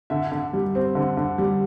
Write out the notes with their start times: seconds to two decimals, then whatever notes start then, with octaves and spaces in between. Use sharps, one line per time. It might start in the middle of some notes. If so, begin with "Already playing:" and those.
0.10 D3 E5
0.32 D3
0.53 G3
0.75 C4
0.95 D3
1.17 D3
1.38 G3